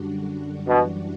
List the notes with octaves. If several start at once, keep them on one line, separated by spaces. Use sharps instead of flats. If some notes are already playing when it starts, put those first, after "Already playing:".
Already playing: F#2 D3 G3 D4 F#4
F#2 B2 E3 G3 D4 F#4